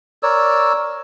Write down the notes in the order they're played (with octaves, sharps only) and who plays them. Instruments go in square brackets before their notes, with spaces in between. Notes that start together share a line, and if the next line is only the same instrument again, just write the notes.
[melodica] A#4 C#5 D5 E6